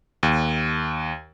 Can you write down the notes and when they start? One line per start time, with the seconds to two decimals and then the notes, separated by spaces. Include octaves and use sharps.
0.23 D#2